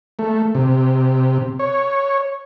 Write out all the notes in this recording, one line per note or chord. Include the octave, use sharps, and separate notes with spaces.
A3
C3
C#5